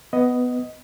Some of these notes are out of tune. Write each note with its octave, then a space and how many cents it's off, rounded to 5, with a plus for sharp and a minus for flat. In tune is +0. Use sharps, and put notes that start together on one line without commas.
B3 +10 D#5 +5